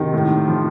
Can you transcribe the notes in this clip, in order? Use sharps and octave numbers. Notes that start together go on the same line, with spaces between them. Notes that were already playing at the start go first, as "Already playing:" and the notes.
Already playing: C3 D#3
A2
F3